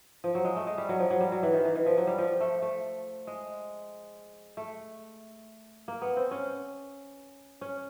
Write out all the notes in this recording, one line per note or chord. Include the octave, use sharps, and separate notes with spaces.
F3
F#3
G#3
A3
G#3
G3
F#3
F3
F#3
G3
F#3
E3
D#3
E3
E3
F3
F#3
G3
F3
A3
A3
G#3
A3
A#3
B3
C4
C#4
C#4